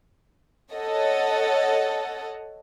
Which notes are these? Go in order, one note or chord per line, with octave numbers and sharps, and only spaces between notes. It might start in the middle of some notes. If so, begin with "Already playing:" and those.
A4 C#5 D#5 F#5